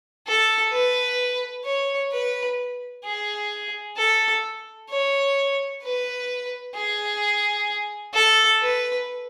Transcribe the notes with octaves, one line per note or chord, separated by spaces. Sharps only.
A4
B4
C#5
B4
G#4
A4
C#5
B4
G#4
A4
B4